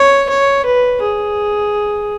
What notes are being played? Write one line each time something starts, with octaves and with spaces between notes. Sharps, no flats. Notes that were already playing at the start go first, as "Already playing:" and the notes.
Already playing: C#5
C#5
B4
G#4